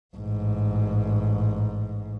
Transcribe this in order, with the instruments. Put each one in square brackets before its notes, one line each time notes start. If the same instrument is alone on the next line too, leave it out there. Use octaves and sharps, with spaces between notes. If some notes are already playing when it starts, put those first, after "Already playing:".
[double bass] A1 G#2